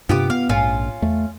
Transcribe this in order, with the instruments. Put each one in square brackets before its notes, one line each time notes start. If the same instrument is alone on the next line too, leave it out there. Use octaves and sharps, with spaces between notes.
[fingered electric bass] G2 C3 [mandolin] B3 G4 D6 [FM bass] F4
[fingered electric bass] B3 [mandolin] F5
[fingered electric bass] A#1 [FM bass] G#2 [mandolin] C#4 F4
[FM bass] E2 [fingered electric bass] A3